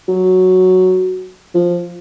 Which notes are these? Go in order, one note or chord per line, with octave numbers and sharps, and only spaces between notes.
F#3
F3